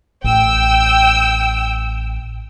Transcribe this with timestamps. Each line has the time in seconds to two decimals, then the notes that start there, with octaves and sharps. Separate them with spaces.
0.24 A1 G5 E6